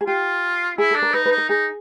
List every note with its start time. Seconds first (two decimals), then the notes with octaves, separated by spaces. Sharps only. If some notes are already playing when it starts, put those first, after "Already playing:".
0.01 G#4
0.07 F4 G4
0.78 E4 G#4
0.91 D4 A4
1.02 A#4
1.14 D#4 B4
1.26 B4
1.32 D#4
1.38 A#4
1.49 D#4 G#4